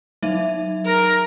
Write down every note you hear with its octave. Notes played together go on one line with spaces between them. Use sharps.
F#3 D#4 E5
A#4